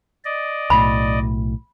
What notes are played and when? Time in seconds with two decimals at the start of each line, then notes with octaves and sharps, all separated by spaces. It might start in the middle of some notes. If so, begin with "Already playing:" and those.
0.25 D5 D#5
0.70 B1 A2 B5